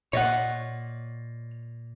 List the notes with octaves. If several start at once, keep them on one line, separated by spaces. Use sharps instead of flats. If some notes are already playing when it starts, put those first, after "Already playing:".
A#2 C#5 D#5 F#5